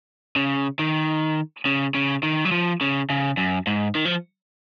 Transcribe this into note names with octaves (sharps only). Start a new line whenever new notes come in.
C#3
D#3
C#3
C#3
D#3
F#3
F3
C#3
C#3
F#2
G#2
D#3
F3